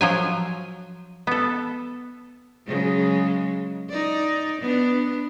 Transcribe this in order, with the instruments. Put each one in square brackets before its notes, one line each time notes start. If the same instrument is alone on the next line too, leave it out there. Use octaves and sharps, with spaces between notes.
[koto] F3 F#3 G#5
B3 A4
[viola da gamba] C#3 F#3 G#3
D#4 D5
B3 D4